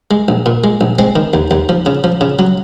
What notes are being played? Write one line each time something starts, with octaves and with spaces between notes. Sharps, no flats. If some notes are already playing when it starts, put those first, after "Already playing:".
G#3
A#1
A#2
G#3
A#1
G#3 C4
D#3
D#2
D#2
F3
C#3
F3
C#3
F#3